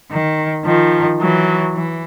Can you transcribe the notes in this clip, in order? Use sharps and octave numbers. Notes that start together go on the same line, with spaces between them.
D#3
D#3 F3
E3 F#3
E3